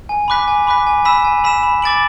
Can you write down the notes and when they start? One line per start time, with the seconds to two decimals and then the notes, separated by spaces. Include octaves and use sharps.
0.09 G#5
0.28 B5 D6 F#6 B6
0.48 G#5
0.67 B5 D6 F#6 B6
0.87 G#5
1.05 B5 E6 B6 E7
1.24 G#5
1.44 B5 E6 B6 E7
1.63 B5
1.82 D6 A6 D7 F#7